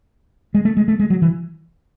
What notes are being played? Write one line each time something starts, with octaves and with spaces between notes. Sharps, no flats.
G#3
A3
G#3
A3
G#3
F#3
E3